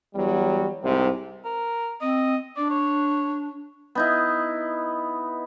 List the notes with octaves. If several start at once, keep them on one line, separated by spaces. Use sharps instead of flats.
E2 F#3 G3
C2 G#2 C3 C4
A#4
C4 D#5
D4 D5
C#5
B3 D#4 E4